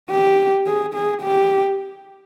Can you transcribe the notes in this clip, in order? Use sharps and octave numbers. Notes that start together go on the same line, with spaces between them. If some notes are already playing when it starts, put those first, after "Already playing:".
G4
G#4
G#4
G4